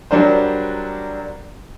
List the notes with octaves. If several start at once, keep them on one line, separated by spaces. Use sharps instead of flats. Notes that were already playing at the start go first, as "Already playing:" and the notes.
F#3 G3 D4 A#4 C5